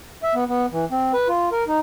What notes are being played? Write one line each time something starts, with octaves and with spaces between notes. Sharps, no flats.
E5
B3
B3
E3
C4
B4
F4
A#4
D#4